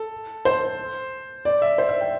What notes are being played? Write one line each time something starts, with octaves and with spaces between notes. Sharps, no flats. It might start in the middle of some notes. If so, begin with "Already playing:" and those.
Already playing: A4
C5
D5
E5
C5
E5
G5